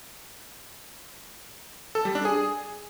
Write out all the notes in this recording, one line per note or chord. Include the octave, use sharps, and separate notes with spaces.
A4
G3
D4
G#4